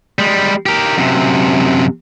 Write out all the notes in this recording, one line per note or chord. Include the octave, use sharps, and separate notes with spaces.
G3 G#3
G4 A#4
F#2 C3